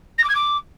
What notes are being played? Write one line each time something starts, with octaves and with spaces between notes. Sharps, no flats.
A#6
D6
G#6
D6